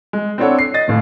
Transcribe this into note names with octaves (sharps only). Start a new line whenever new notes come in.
G#3
C4 D4 E4 A4 C#5 F#5
C7
D#5 A6
D1 A2 F5